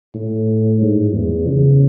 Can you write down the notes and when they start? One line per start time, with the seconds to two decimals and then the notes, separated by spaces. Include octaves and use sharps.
0.14 A2
0.81 G#2
1.14 E2
1.47 C#3